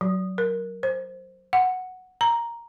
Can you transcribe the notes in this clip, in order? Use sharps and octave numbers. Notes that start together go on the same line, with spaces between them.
F#3
A#4
C5
F#5
A#5